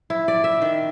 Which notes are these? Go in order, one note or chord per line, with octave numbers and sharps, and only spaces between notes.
E4
D5
E5
D#3